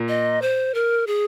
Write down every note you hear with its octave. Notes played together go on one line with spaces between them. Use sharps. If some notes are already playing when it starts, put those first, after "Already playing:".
Already playing: A#2
D#5
C5
A#4
G#4